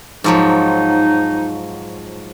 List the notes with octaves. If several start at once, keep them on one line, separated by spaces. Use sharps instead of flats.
G#2 F3 F#3 D#4